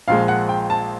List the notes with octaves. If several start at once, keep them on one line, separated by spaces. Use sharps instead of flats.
A#1 A#2 F3 G#3 F5
F#5
G5
A5